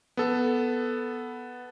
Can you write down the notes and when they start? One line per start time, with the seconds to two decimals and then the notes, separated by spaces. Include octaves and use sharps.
0.17 B3 A4